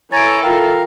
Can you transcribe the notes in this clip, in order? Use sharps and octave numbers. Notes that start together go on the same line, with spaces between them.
E3 A4 C#5 G#5 A#5 A6 D7
F4 A#4 F5 G5